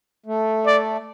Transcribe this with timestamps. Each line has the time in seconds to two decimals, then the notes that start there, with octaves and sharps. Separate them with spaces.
0.26 A3
0.66 D5